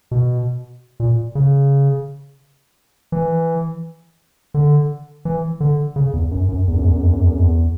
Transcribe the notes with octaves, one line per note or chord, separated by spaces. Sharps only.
B2
A#2
C#3
E3
D3
E3
D3
C#3
E2
F#2
F#2
E2
F#2
E2
F#2
E2
F#2
E2
F#2
E2